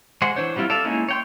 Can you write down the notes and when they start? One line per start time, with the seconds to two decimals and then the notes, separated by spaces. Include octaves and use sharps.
0.22 G#3 F#4 C5 F#5 C6
0.36 E3 D4 C5 C#5
0.56 F#3 G3 C4 E4 F4
0.70 A4 D5 E5 F5
0.85 G#3 A#3 C#4 D#4 E4
1.09 C#5 G5 C6